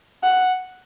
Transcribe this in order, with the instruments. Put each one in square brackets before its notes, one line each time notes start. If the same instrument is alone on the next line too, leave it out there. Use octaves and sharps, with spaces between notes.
[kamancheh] F#5